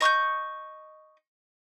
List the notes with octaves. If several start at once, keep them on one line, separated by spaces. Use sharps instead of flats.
D#5 C#6 F#6 G6